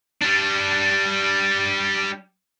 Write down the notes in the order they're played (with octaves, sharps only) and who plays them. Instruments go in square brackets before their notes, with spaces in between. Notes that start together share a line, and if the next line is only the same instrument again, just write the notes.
[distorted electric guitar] G3 D4